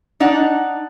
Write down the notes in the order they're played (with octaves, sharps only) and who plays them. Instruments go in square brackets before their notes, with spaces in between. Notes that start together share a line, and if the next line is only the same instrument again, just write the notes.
[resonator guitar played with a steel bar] D4 D#4 F#5